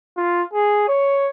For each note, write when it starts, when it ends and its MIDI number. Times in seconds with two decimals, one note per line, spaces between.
0.17 0.43 65
0.53 0.87 68
0.88 1.29 73